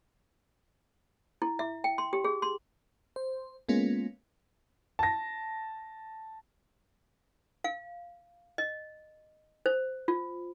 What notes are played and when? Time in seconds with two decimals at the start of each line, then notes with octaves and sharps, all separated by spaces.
1.42 E4
1.59 E5
1.84 G5
1.98 C6
2.13 G4
2.24 G#4
2.42 C6
3.16 C5
3.69 G#3 A#3 B3 C#4 F4
4.99 A5 A#6
7.64 F5
8.58 D#5
9.66 C5
10.08 F4